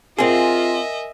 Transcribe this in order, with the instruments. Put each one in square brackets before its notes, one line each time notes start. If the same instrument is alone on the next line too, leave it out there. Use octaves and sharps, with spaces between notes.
[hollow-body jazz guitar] C4 G#4 [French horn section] F4 [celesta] A#4 G#5 [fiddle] D#5 E5